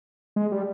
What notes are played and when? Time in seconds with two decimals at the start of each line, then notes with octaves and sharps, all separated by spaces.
0.36 G#3
0.52 G3